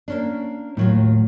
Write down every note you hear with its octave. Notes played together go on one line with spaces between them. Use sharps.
A#3 C#4 D4
D#2 A2 F#3 F4